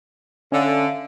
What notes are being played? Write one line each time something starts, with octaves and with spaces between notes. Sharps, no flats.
D3 C#4 E5 F5